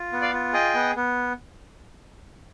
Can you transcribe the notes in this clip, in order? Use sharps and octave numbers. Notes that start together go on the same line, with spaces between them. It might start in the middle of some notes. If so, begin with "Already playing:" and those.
Already playing: F4
B3
D5 F5
F4
G#4 D#5 G5
B3
B3